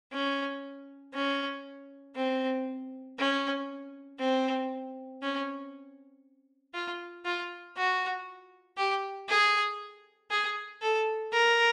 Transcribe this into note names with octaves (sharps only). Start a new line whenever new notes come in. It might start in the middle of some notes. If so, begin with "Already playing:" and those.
C#4
C#4
C4
C#4
C4
C#4
F4
F4
F#4
G4
G#4
G#4
A4
A#4